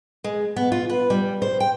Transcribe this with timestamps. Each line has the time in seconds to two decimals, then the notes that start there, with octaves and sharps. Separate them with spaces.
0.24 G#3
0.56 B3
0.72 F4
0.89 B4
1.10 G3
1.42 C5
1.60 G5